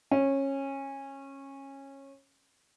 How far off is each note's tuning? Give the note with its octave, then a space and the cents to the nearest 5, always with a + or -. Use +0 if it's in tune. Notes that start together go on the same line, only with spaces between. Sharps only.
C#4 -20